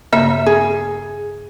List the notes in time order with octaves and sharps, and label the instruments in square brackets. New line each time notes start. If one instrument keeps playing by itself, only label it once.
[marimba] G2 C#3 A#3 [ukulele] E5
[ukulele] G#4